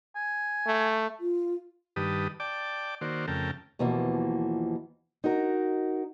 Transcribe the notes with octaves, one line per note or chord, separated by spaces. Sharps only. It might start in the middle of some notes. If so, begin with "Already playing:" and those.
G#5
A3
F4
G2 D#3 G4 B4 A5 D#6
D5 G5 A5 D6
D#3 A#3 F#4 C5 D5
F2 C#3 A3 A#4 G5 A5
D#2 B2 E3 F3 A#3
D#4 F#4 A#4